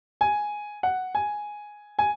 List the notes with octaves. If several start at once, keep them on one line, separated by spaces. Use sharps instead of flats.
G#5
F#5
G#5
G#5